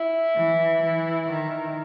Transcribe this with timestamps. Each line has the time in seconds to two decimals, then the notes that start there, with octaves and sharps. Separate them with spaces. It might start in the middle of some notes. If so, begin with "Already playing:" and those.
Already playing: E4
0.36 E3
0.83 E3
1.29 D#3